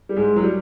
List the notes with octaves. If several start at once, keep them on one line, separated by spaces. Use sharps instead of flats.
G3
G#2 G#3
F#3
G3